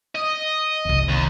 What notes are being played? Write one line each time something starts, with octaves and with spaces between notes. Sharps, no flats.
D#5
F#1 C2
D#2